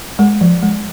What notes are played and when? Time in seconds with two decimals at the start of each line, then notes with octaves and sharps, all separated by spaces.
0.19 G#3
0.41 F3
0.63 G#3